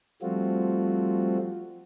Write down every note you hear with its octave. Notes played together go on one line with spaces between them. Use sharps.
F3 G3 A3 C4 F4 F#4